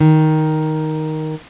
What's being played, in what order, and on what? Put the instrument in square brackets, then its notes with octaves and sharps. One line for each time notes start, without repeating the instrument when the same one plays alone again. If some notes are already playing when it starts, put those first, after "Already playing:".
[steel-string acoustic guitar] D#3